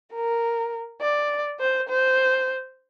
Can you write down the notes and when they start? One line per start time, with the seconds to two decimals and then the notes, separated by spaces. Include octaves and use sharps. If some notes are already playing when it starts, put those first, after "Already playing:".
0.14 A#4
1.01 D5
1.60 C5
1.89 C5